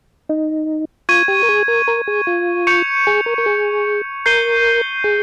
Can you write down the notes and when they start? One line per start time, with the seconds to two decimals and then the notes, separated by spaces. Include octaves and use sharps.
0.29 D#4
1.09 F4 C#6 G#6 D#7
1.28 G4
1.43 A#4
1.49 G#4
1.68 A#4
1.88 A#4
2.08 G#4
2.27 F4
2.67 C#6 G6 C#7 F7
3.07 G#4
3.26 A#4
3.38 A#4
3.46 G#4
4.26 A#4 G6 C7 D#7 G7
5.04 G#4